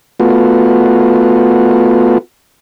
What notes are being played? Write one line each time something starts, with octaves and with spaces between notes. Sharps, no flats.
A3 B3 F4 F#4